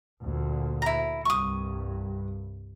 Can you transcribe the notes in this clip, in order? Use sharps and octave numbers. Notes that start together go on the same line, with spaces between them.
D2 A#2
E4 A#5
C2 G2 C#6 D#6